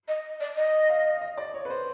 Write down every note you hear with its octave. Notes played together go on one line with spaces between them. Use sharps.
D#5
D5
D#5
F5
D#5
D5
C#5
B4
C5